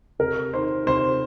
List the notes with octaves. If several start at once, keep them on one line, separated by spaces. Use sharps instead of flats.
C3 A#4
D#3 C5
C3 C5